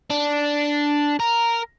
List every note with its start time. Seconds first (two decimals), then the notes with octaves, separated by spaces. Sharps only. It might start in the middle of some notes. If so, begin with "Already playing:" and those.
0.10 D4
1.20 A#4